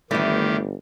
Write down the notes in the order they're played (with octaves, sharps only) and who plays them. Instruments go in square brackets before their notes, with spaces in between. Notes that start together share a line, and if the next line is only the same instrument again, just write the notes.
[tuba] G1 [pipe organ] D#3 G4 [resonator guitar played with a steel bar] E3 G3 [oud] A3 E4 E5